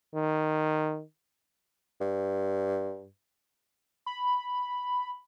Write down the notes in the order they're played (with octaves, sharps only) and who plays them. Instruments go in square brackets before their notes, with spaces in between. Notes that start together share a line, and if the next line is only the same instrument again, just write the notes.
[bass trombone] D#3
[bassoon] G2
[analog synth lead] B5